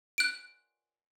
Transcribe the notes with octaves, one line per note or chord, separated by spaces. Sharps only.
F#6 D7